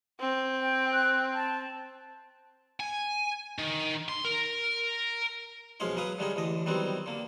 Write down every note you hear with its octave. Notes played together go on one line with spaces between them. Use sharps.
C4
G5
F#6
A5
G#5
D#3
C6
A#4
B1 F3 G#3 C#4 F5 C6
F#3 B4 F5 D#6
D3 G3 G#3 C#4 D#4
A1 D3 D#5
D#3 F#3 G3 B3 C4
D3 A#3